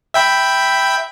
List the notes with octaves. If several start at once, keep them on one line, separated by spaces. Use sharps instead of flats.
E5 G5 B5